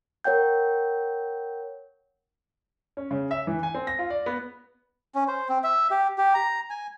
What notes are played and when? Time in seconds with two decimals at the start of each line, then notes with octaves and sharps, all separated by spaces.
0.24 A#4 C#5 F#5 G5 G6
2.97 C#4
3.11 C#3
3.31 E5
3.47 E3
3.63 G#5
3.74 C4
3.87 A#6
3.99 F4
4.10 D5
4.26 B3
5.15 C#4
5.28 C5
5.49 C4
5.64 E5
5.91 G4
6.18 G4
6.34 A#5
6.70 G#5